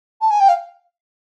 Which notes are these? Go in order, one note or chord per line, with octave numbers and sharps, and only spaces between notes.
A5
G#5
G5
F5